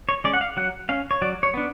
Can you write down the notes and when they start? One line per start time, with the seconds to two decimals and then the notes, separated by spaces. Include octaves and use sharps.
0.09 C#5
0.24 G#3 C#4 D5
0.33 F#5
0.41 F5
0.57 F#3 F#5
0.89 C#4 F5
1.11 C#5
1.22 F#3 D5
1.43 C#5
1.54 B3 D4